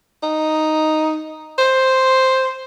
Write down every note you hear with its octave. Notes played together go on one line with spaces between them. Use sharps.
D#4
C5